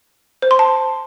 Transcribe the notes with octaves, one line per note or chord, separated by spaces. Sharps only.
C5
C6
A5